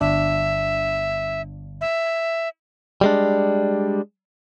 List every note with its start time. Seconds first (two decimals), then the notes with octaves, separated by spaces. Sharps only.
0.01 G1 D4 E5
1.81 E5
3.01 G3 G#3 D4